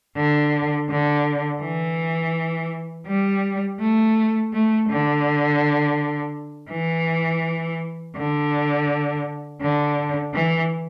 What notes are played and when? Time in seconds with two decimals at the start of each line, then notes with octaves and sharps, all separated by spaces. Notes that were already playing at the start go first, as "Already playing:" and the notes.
0.17 D3
0.90 D3
1.62 E3
3.07 G3
3.80 A3
4.54 A3
4.90 D3
6.71 E3
8.17 D3
9.62 D3
10.34 E3